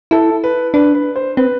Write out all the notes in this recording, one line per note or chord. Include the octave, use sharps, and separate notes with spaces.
E4 A4
B4
D4 B4
B4
C5
C4 B4